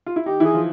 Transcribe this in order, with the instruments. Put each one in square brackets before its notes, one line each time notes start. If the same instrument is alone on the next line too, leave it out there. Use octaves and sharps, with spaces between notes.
[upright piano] F4
E4
[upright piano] D#3 D#4 [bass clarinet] G4
[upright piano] E3 E4 [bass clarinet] G#4
[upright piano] F3 F4